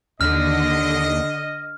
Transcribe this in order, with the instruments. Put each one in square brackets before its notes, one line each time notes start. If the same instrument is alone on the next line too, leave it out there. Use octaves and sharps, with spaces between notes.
[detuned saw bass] D#2 [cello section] D3 [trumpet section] D#5 [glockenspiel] F6